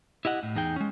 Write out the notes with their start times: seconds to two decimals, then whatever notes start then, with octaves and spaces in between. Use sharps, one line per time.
0.25 E4 G4 D#5 F#5
0.43 A2
0.55 E2 D#4 G#4 G5
0.76 G#3 C#4